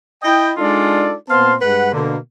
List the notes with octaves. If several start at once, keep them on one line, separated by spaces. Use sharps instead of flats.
E4 D#5 G5
G#3 D4 D#4 F4 A4 D5
A#2 B3 C4 F5 A5 C6
G2 G#3 B4 F#5
B2 D3 A#3